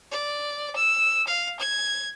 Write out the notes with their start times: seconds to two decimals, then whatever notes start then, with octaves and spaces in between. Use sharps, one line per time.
0.11 D5
0.76 E6
1.27 F5
1.60 G#6